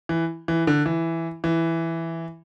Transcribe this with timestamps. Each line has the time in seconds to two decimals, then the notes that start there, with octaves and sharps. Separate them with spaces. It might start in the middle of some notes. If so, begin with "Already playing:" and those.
0.09 E3
0.48 E3
0.67 D3
0.86 E3
1.44 E3